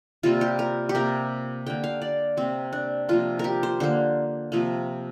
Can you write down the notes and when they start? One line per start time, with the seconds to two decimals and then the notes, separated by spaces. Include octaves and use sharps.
0.23 C3 G3 A#3 F4
0.41 G4
0.59 A#4
0.89 G4
0.95 C3 A#3 A#4
1.67 D3 A#3 G5
1.84 F5
2.02 D5
2.37 C3 A#3 C4
2.73 D4
3.09 C3 F3 A#3 F4
3.39 G4 A#4
3.63 C5
3.80 D3 A#3 C5
4.52 C3 F3 A#3